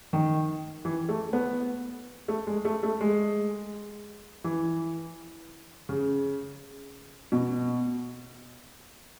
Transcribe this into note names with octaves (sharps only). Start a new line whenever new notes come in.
D#3
E3
A3
B3
A3
G#3
A3
A3
G#3
E3
C#3
B2